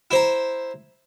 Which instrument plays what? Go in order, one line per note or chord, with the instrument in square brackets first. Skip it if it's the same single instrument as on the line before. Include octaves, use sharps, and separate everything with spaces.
[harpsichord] E4 C5 A#5